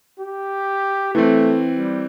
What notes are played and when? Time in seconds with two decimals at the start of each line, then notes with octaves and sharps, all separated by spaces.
0.20 G4
1.15 E3 A3 C4
1.77 G3